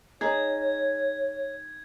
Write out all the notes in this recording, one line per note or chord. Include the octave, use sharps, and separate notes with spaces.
D#4 G#4 C#5 G#6